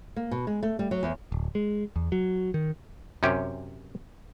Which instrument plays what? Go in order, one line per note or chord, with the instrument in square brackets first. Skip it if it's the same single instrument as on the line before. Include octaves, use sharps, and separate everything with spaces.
[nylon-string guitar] A#3
B2
G#3
A3
G3
F#3
E2
[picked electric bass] D1
G#3
E2
F#3
D#3
[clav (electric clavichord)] F#2 C3 C#4 G4